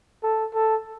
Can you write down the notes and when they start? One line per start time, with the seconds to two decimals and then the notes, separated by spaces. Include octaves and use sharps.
0.23 A4
0.54 A4